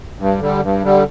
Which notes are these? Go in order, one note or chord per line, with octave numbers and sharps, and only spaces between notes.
G2
D3 G3
G2
D3 G3